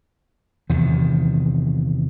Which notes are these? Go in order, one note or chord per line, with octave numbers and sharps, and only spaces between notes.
E2 C3 D#3